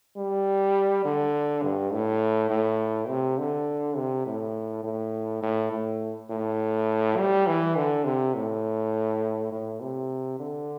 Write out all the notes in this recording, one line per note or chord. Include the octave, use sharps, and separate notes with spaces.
G3
D3
G2
A2
A2
C3
D3
C3
A2
A2
A2
A2
A2
G3
E3
D3
C3
A2
A2
C3
D3